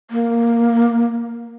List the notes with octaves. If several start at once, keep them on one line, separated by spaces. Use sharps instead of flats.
A#3